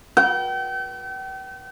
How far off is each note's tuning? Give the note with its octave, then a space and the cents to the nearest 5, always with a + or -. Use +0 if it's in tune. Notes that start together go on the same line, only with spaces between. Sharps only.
G5 -40